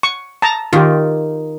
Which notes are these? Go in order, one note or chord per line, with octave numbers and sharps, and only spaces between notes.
C#6
A5 A#5
D#3 F4 G4